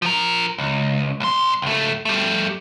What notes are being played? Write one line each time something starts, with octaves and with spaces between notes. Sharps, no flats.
F3 A#4
C#2
B1 C6
C#2 A3
G3 A3